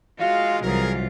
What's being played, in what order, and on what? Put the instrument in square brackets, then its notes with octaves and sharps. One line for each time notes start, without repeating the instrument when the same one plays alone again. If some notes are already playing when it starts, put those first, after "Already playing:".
[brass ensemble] G#3 F4 [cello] F#4 [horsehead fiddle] F5
[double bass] C2 [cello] E3 F4 [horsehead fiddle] F#3 [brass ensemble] G#4 A#4